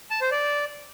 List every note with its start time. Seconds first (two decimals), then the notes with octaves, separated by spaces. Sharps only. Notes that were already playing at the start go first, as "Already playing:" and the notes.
0.10 A5
0.21 C5
0.31 D5